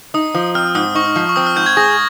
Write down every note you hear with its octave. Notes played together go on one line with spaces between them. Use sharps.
D#4 D#6
F3
C4 F6
G#2 D#6
D#4 C#6
F3
C#6
C4 D#6
F6
G#2 G6
G#6
G#4 A#6